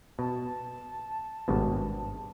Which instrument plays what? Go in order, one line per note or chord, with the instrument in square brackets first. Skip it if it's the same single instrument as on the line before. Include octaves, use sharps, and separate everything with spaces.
[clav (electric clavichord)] B2 [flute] A5
[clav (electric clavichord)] G#1 G2 B2